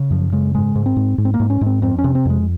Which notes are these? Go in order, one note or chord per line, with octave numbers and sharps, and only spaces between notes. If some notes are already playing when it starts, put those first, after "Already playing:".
Already playing: C#3
F#2 F3
C#3 G#3
G#2 G#3
G#2
C4
G#2
G#2
C4
A#3
G#2
C#4
G#2
C4
F2 C4
C#4
C3
C4
F2 G#3